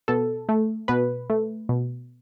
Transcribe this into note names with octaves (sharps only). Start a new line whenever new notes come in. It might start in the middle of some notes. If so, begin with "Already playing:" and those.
B2 A4
A3
B2 B4
A3
B2